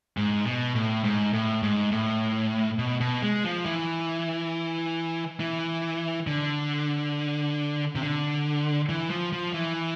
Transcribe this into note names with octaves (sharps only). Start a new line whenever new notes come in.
G#2
B2
A2
G#2
A2
G#2
A2
B2
B2
G#3
F3
E3
E3
D3
C3
D3
E3
F3
F3
E3